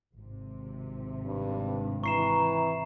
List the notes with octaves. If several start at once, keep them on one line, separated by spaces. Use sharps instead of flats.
G#1 C3
G2
E3 A#5 C#6 C7 E7